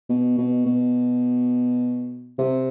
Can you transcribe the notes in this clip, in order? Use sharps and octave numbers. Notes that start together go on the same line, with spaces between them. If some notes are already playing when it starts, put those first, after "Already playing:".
B2
B2
B2
C3